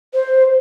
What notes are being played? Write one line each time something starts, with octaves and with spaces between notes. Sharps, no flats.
C5